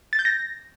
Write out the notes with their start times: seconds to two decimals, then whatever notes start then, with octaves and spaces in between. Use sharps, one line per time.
0.13 A6
0.19 G6
0.25 A#6